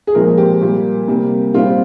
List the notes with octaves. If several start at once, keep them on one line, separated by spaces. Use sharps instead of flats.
G#4
A#2 F3 G#3 C4 A#4
G4
A#2 G3 A#3
C3 G3 A#3
A#2 G3 C4 F4